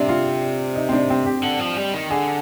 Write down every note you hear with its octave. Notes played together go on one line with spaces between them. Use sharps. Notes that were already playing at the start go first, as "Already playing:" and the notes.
Already playing: C3 C4 D4
F4
D#4
C4
D4
C4
G4
D3
F3
G3
D#3
D3 G#4